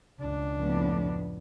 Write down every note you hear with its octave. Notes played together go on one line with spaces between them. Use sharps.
C#2 D4
F2 A2 B3